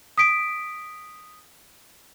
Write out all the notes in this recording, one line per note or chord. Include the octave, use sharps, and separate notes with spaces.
D#6 B6 D7